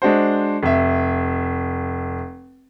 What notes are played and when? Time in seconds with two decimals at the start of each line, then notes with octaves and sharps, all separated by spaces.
0.02 G#3 D4 F#4 C5
0.63 F1 E5